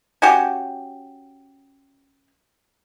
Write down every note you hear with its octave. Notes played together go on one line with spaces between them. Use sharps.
C#4 F#4 G4